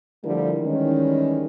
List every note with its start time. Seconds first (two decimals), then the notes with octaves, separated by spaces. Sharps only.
0.24 D3 F3 G3 A3 E4 A#4
0.61 D#3 E3 G3 G#3 C#4